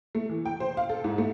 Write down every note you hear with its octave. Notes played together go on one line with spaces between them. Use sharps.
A3
E3
G5
C5
F5
A4
G#2
A3